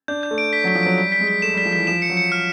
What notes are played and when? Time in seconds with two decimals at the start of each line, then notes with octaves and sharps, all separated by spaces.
0.08 D4 G6
0.23 G6
0.31 A3
0.38 D7
0.53 B6
0.64 F#3
0.68 B6
0.75 F3
0.83 F#3 D7
0.97 G3 B6
1.12 B6
1.20 G#3
1.27 B6
1.42 A3 E7
1.54 G3
1.58 B6
1.65 F3
1.73 E3 B6
1.87 F3 E7
2.02 C#7
2.10 F#3
2.17 C#7
2.32 F6